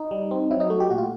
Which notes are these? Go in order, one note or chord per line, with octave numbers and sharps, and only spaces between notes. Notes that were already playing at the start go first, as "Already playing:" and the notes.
Already playing: D#4
G3
C4
F#3 E4
D#4
A3 F#4
G4
A#2 F#4
F4